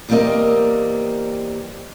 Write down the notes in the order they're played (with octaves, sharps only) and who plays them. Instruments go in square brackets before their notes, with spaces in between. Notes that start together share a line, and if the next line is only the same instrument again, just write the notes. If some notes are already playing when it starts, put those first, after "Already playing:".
[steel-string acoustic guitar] E2 G3 A#3 C4 A#4 D#5